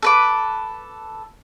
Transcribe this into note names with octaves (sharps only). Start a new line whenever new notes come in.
A4 B4 D6